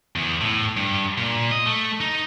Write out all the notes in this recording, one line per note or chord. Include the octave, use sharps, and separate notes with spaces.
E2
A2
G2
A#2
D#5
A3
D#4